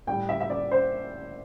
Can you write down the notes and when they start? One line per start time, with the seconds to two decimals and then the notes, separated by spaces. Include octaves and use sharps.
0.07 A2 G3 G5
0.29 E5
0.41 E5
0.50 D5
0.71 C5